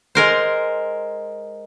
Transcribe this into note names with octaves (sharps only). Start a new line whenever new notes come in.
G#3 A#4 C5